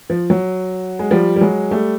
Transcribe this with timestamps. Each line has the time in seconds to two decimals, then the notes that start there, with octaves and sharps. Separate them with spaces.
0.10 F3
0.30 F#3
0.99 G#3
1.11 F3 G3
1.36 G3
1.41 F#3 G#3
1.71 G3 A3